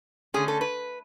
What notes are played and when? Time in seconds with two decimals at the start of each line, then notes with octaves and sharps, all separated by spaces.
0.34 D3 A3 C#4 G#4
0.48 A4
0.61 B4